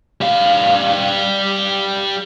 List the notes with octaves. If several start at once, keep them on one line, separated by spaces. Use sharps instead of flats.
G3 F5